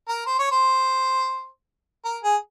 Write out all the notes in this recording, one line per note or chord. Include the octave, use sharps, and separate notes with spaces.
A#4
C5
C#5
C5
A#4
G#4